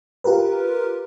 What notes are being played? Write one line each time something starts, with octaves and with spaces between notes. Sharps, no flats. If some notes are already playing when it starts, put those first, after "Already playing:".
F4 G4 A#4 B4